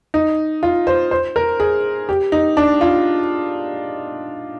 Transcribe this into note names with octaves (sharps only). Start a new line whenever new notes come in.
D#4
F4
C5
C5
A#4
G#4
G4
D#4
D4
F4